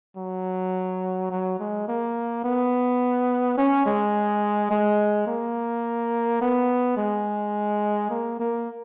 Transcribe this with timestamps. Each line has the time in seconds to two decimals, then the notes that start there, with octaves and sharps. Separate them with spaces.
0.16 F#3
1.30 F#3
1.59 G#3
1.88 A#3
2.44 B3
3.58 C#4
3.86 G#3
4.71 G#3
5.27 A#3
6.41 B3
6.97 G#3
8.10 A#3
8.39 A#3